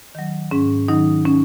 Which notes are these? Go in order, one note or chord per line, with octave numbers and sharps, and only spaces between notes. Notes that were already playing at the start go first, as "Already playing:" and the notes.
D#3 F#3
G#2 C#4
D#3 F#3 D#4
C#4